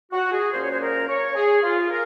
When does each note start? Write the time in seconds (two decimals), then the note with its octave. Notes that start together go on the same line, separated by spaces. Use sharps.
0.12 F#4
0.31 G#4
0.52 A#2 F3 A#3 C#4 C5
0.61 C#5
0.70 C5
0.80 A#4
1.08 C#5
1.34 G#4
1.62 F4
1.89 A#4